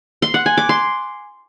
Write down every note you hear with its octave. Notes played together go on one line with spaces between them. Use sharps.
C6
F#5
G#5
D6
C6